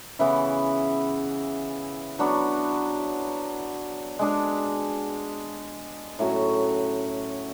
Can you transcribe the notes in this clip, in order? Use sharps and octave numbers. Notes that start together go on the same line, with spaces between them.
C#3 E3 B3 E4
F#3 B3 D4 F#4
G#3 D4 G#4
A2 F#3 C#4 F#4